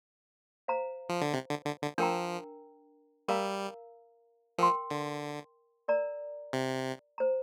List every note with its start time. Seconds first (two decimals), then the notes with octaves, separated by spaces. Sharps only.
0.68 C5 F5 A#5
1.09 F3
1.21 D3
1.33 C3
1.49 D3
1.66 D3
1.82 D3
1.98 F3 D4 A#4 G5 A#5
3.28 G3 A#4 F5 A#5
4.58 F3 A#4 G5 C6
4.90 D3
5.88 A#4 D5 A#5
6.53 C3
7.18 C5 A#5